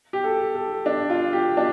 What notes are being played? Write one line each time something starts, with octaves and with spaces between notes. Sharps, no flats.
G4
A4
A4
D4
F4
G4
D4